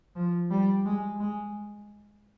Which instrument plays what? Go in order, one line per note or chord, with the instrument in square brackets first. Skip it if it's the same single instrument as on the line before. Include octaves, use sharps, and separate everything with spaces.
[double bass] F3
G3
G#3
G#3